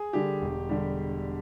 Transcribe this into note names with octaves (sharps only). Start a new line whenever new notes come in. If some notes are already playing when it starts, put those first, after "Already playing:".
Already playing: G#4
D3 G3 G4
E1
D3 G3